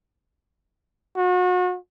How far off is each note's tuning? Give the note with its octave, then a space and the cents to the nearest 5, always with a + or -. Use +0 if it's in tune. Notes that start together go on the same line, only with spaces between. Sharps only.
F#4 -35